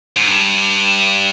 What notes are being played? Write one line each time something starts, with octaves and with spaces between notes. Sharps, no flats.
G#2
G2